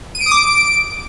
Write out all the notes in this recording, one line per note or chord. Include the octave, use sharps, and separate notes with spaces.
D#7
D7
D#6
D6
D7